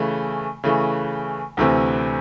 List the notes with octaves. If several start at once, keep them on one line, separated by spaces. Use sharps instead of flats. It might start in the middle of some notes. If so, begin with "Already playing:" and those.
Already playing: C#3 E3 A3
C#3 E3 A3
D2 C3 E3 A3 C4